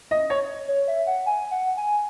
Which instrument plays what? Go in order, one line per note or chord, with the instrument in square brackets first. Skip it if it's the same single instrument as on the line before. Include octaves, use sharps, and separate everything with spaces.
[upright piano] D#5
C#5
[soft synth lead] C#5
E5
F#5
G#5
F#5
G#5